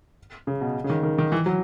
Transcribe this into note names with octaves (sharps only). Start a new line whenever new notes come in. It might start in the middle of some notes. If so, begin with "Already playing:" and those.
C#3
B2
C#3
D#3
D#3
D#3
E3
F#3